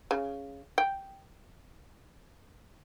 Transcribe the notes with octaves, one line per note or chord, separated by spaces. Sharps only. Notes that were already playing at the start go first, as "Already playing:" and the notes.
C#3
G5